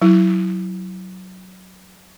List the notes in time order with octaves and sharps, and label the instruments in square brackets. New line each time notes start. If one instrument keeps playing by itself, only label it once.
[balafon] F#3 E4